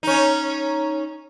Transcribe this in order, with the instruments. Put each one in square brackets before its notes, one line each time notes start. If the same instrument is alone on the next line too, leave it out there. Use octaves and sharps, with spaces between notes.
[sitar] C#4 D#4